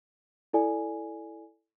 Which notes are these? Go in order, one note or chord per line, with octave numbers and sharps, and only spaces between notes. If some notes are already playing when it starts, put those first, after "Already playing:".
E4 A4 D5 G#5